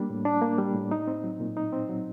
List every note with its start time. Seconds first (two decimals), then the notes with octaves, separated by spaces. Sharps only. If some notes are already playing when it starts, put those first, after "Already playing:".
Already playing: G3 A#3 D4
0.10 A2
0.25 D4
0.41 A#3
0.58 G3
0.75 A2
0.91 D#4
1.07 C4
1.24 F#3
1.40 A#2
1.57 D#4
1.73 C4
1.89 F#3